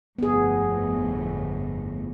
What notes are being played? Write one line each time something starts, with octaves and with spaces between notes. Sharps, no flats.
G1 F2 A2 B3 G#4